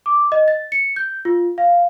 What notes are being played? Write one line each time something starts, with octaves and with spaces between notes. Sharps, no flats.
D6
D#5
A6
C#7
G6
F4
F5